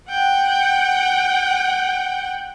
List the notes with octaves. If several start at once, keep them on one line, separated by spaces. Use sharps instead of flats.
F#5 G5